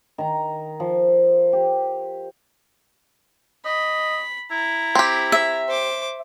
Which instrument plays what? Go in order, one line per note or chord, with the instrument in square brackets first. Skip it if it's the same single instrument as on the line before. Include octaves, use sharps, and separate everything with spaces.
[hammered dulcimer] D#3 A#5
F3
G4
[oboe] D#5 [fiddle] B5
[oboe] E4 [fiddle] A#5
[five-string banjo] C4 G4
[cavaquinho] E5
[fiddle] C5 D6